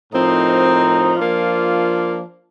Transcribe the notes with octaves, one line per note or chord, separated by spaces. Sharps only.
A2 F3 C4 D#4 A#4
F3 A#3 D4 F4